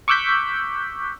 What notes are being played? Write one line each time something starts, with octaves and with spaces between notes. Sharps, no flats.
C#6 D6 E6 F#6 G6 B6